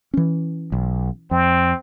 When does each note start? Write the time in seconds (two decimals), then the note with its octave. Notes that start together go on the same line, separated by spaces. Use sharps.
0.14 E3 C#4
0.72 B1
1.31 F2 C4